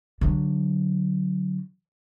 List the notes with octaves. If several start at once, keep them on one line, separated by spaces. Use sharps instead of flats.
D3 F#3